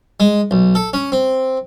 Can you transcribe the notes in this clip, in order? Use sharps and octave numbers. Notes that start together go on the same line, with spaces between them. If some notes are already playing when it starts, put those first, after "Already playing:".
G#3
B1
A4
C#4
C4